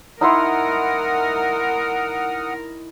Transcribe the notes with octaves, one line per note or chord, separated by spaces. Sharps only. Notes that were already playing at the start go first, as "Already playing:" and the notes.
D#4 E4 A#4 F#5 C6 D#6 F6